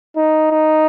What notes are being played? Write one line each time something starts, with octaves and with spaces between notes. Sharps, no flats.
D#4
D#4